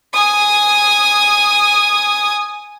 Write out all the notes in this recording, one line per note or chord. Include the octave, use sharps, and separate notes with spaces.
G#5 D#6